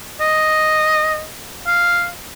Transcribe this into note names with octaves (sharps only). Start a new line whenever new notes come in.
D#5
F5